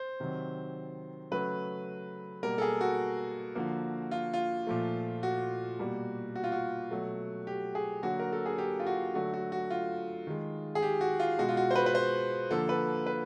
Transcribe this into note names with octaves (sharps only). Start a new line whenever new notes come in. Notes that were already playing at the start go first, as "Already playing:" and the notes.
Already playing: C5
C3 D#3 F#3
C#3 F#3 A3 B4
B2 G3 A#3 A#4
A4
G#4
F#4
D3 F3 A#3
F4
F4
A#2 F3 A3
F#4
B2 G3 A#3
F#4
F4
F#4
B2 F#3 A3
G4
G#4
D3 F#3 A#3 F#4
A#4
A4
G#4
G4
F4
F#4
D3 F#3 A3 F#4
F#4
F#4
F4
D#3 G#3
G#4
G4
F#4
F4
B2 G#3 F#4
F4
F#4
C5
B4
B4
C5
D3 F3 A#3 A4
B4
B4